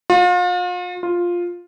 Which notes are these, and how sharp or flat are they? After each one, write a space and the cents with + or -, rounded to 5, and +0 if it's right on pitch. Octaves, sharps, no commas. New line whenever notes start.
F4 +40
F4 +5